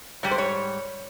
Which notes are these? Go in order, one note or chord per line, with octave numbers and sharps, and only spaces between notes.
G#2 G3 C#5
C5
C#5